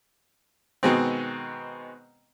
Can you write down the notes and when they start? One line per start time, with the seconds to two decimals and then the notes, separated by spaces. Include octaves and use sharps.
0.83 B2 D#3 G#3 B3 C4